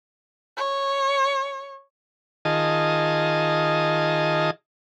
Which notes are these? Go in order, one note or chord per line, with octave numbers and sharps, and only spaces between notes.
C#5
D#3 F4 G#4 D#5 A5